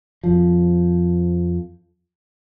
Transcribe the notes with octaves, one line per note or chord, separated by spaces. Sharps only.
F2 F3